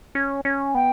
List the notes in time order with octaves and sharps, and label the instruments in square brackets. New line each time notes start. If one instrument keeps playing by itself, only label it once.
[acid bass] C#4
C#4
[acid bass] B3 [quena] G5